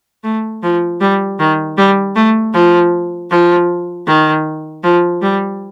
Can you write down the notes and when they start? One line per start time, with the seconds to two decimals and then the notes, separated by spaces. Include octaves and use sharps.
0.24 A3
0.63 F3
1.01 G3
1.39 D#3
1.77 G3
2.15 A3
2.54 F3
3.30 F3
4.07 D#3
4.84 F3
5.22 G3